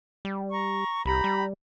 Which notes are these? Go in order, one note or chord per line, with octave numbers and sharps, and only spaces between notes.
G3
A#5 C#6
C2 G4 A#5 B5
G3